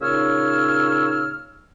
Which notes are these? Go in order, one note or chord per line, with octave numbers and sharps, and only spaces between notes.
A#2 C#3 D#4 C#5 E6 F6